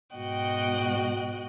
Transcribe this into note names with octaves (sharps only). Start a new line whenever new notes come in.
G#2 B2 F#4 D#5 G5 F#6